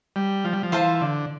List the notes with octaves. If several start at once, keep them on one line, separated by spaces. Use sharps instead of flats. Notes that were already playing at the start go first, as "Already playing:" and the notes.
G3
F3
G3
F3
E3 F4 C5 F5 A5
D3